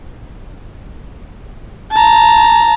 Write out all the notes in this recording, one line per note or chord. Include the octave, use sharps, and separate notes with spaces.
A5 A#5